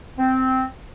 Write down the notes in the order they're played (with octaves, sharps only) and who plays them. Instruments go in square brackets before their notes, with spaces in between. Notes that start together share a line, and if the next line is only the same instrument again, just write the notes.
[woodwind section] C4